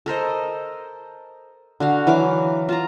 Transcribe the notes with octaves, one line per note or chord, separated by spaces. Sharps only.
A4 A#4 C5 D#5
D3 F#4 F5
E3 F#3 F5 D6
F4 A5 A#5